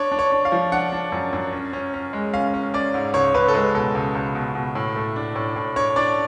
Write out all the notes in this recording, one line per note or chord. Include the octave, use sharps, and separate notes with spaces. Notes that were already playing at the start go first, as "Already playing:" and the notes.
Already playing: D4 C#5
D4
C#5
D4
F5
F3
D4 F#5
D4
F#2
F#2
C#4
C#4
C#4
G#3
C#4 F5
C#4
C#4 D5
G#2
C#2 C#5
C#2 B4
A4
G#3 B4
B2 A4
C#2
C#2
B2
B2
A2
A3
D4
A2
A2
D4 C#5
D4 D5